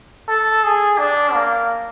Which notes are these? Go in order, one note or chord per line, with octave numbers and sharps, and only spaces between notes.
A4
G#4
D4
A#3